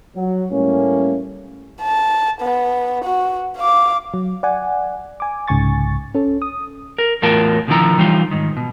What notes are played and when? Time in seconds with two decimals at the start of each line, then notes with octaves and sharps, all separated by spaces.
0.16 F#3 F#4
0.51 A2 G3 A3 A#3 C#4
1.82 A5
2.41 B3
3.04 F#4
3.57 F5 D6
4.14 F#3
4.43 D5 F#5 G#5
5.20 G#5 D6
5.48 C2 G#2 C#3 G#5 C#6 A6
6.14 C#4 A4
6.42 D#6
6.98 A#4
7.22 E2 A2 F#3 F4 A#4 A5
7.67 B2 D3 D#3 F3 E4 A#5
7.98 E3 G3 D#4 F4
8.31 G#2 D#3
8.57 B2